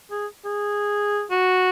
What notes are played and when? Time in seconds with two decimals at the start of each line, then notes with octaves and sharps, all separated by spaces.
0.11 G#4
0.45 G#4
1.31 F#4